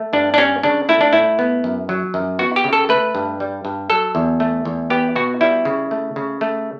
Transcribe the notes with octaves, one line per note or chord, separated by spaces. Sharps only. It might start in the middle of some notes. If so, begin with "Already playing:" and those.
Already playing: A3
G2 D4
D4
G3 C#4
C#3 D4
A3 E4
D4
A2 E4
B3
F#2
F#3
F#2
B3 F#4
G4
C#3
A4
A3 B4
G2
G3
G2
F#3 A4
E2
A3
E2
B3 G4
B2 F#4
G3 E4
C#3
A3
C#3
A3